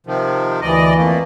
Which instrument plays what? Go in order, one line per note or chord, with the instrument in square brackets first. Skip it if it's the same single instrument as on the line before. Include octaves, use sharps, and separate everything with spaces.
[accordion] C3 D#3 F3
[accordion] D2 D5 D#5 [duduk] E3
[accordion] F2 A3 A#3